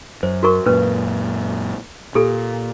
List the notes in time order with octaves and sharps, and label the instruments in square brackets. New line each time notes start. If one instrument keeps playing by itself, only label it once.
[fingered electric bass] F#2 [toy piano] C5
[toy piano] F#4 A#4 C#6
[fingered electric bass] F#2 A#2 [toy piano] C#4 B4
[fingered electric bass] A#2 [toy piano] G4 A4